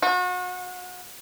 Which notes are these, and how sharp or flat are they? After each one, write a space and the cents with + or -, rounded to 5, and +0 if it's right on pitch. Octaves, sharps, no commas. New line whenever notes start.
F#4 -35